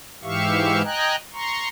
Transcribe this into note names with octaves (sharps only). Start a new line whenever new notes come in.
G#2 E3 G4 E5 F5 C#6
D#5 G5 G#5 A#5 F#6
A#5 C6 C#6